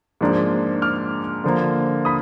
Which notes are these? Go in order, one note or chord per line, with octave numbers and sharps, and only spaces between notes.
G#2 F3 A#3 D4
D6 F6
D3 F3 A#3
B5 D#6